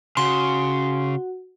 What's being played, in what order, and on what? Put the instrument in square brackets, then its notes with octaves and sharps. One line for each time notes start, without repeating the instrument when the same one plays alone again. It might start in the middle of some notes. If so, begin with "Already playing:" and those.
[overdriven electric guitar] C#3 [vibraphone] F#4 F#5 [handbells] C6